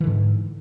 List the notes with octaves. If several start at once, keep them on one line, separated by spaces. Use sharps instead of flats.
G#2 D3 E3